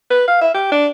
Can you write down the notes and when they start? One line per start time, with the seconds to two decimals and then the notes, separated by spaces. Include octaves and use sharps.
0.10 B4
0.28 F5
0.42 E5
0.54 G4
0.72 D4